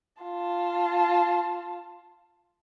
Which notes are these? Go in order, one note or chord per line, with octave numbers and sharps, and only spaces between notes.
F4 A5